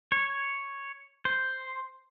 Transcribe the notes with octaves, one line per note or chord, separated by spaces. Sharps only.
C#5
C5